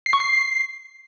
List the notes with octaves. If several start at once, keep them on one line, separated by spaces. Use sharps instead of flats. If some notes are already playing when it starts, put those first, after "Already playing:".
C7
C#6
C7